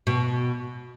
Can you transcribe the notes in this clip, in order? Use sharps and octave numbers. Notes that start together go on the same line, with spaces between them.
B2